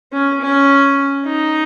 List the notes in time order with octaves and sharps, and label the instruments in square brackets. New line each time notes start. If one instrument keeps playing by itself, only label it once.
[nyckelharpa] C#4
C#4
D#4